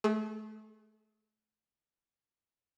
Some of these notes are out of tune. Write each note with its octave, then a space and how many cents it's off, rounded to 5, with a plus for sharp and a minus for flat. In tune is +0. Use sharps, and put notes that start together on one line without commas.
A3 -30 G#4 +0